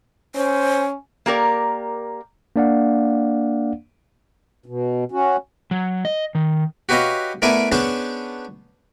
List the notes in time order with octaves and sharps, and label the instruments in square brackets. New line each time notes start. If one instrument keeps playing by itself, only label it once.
[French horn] C#4 [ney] C5
[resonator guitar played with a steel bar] A#3 G4 A#4 D5
[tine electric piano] A#3 D4 D5 F5 F#5
[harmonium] B2
C#4 F#4
[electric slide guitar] F#3
D#5
D#3
[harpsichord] F#4 G4 B4 C#5 D#5 F5
A3 B3 E4 A#4 D5 G#5
B3 C#4 D4 G#4 C5 A5